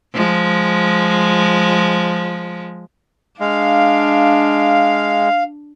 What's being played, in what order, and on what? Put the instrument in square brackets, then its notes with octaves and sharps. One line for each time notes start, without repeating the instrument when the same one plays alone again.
[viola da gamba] F3 G#3
[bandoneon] G#3 [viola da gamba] D4 [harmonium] F5